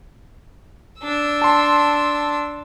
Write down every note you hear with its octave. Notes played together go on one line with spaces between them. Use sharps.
D4 E6
A5 C6